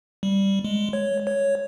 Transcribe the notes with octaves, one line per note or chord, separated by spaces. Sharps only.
G3
G#3
C#5
C#5